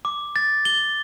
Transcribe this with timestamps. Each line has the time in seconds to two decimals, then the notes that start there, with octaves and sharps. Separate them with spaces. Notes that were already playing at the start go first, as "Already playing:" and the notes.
0.05 D6
0.36 A6
0.65 G7